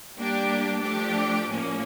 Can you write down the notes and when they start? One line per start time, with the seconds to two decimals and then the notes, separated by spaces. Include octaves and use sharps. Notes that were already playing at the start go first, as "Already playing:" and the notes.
0.16 G3 A#3 D4 G4
0.82 F3 A3 D4 G4
1.48 A2 F3 A#3 C#4